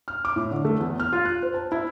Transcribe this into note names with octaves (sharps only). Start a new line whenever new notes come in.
F6
D6
A2
D3
A3
E2
F6
F4
F#6
C5
A5
E4